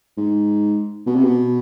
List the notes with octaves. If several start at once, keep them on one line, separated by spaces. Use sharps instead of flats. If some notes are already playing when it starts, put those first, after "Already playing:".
G#2
B2
C3
B2